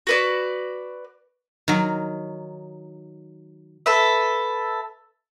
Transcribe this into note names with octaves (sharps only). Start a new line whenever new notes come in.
F#4 B4 D5
D#3 F#3
A4 B4 E5